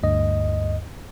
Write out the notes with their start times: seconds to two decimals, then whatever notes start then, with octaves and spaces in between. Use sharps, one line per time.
0.03 D2 G2 D#5